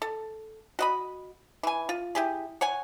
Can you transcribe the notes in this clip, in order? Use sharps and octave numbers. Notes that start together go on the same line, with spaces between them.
A4
F#4 D#5 B5
E3 G#5
F4
E4 G4 G#4
C#5 F#5 G#5